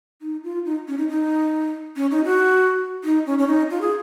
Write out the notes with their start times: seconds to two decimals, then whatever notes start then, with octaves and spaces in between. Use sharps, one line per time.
0.21 D#4
0.44 F4
0.65 D#4
0.88 C#4
0.97 D#4
1.09 D#4
1.96 C#4
2.11 D#4
2.25 F#4
3.04 D#4
3.26 C#4
3.39 C#4
3.47 D#4
3.70 F4
3.81 G#4